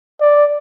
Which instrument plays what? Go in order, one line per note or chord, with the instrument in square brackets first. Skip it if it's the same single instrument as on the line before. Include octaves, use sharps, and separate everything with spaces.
[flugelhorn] D5